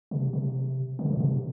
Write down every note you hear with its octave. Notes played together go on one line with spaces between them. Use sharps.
C3
C3
D3
C3
A#2
C3